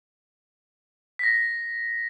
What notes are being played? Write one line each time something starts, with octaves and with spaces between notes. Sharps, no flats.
A#6 B6